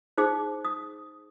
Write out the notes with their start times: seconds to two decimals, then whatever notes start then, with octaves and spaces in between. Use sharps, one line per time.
0.18 D#4 G#4 C5 D6
0.65 D#6